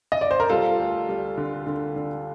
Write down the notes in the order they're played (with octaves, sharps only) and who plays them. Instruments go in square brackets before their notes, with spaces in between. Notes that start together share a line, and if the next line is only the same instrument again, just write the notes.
[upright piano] D#5
D5
C5
A#4
G3 F4 A4
D2
G3
D3
D3
D3